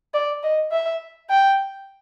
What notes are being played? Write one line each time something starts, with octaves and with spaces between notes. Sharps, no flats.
D5
D#5
E5
G5